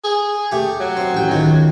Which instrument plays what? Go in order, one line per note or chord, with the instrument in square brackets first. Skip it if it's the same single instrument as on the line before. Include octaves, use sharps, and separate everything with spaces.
[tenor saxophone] G#4
[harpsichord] A3 G4
[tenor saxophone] F#3
[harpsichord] C4
A1 G5
C#2 D#3